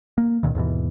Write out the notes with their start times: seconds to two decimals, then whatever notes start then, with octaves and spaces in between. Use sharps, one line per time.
0.18 A#3
0.43 C#2 A#2 D#3
0.55 D#2 G#2 B2 E3